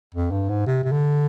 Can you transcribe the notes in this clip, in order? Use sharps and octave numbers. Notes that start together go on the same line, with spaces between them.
F2
G2
G#2
C3
C3
D3